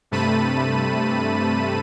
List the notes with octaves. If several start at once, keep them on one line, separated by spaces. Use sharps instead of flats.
G2 C3 A3 A5 B5 D#7